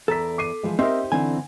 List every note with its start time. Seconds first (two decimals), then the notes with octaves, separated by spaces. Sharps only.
0.08 E2 A4 D5 A#5 B6
0.38 D6 C7 D#7
0.63 E3 F3 G#3
0.79 C4 D#4 G4 A#4 C5 D#5 E5 C6
1.12 D3 E3 C4 D#4 G#5